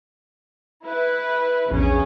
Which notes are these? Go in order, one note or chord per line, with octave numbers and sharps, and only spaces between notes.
E4 B4
A#1 E2 C#3 C#4